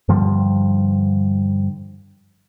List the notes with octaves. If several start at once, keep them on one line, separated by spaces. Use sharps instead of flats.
G2 D3 F3 G3